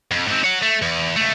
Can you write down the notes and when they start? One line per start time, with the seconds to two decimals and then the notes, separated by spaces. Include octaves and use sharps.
0.11 F2
0.27 G#2 C4
0.44 C#5 F#5
0.62 A3
0.82 E2
1.16 C#2 A3